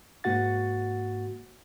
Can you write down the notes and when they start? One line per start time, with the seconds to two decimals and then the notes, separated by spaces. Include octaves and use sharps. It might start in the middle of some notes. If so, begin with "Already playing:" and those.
0.24 G#2 A#3 F#4 F#5 A6